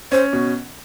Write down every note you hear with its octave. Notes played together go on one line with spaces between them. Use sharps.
C#4 C5
B2